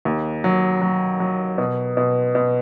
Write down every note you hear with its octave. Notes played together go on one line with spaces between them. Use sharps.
D#2
F#3
F#3
F#3
B2
B2
B2